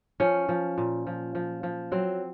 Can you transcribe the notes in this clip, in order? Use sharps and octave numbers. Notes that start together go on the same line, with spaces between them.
F3 C#4
F3
A#2
F3
F3
F3
F#3 C4